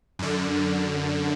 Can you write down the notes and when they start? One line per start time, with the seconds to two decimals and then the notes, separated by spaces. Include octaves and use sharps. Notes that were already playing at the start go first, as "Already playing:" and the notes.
0.19 F#2 D3